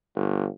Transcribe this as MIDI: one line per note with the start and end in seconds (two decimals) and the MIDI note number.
0.15 0.47 31